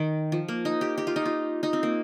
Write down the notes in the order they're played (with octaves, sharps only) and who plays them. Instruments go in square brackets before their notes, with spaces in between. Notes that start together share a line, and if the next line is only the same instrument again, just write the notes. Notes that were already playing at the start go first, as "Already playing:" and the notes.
Already playing: [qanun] D#3
F3
A#3
D#4
G4
G4
F4
D#4
F4
D#4
C4
A#3